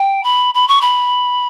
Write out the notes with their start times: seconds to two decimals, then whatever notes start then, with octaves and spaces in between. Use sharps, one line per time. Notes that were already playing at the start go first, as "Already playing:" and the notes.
Already playing: G5
0.23 B5
0.54 B5
0.68 C#6
0.81 B5